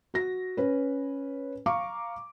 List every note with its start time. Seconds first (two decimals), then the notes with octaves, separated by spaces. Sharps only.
0.14 F#4 A#6
0.57 C#4 B4
1.66 F5 A#5 C#6 D6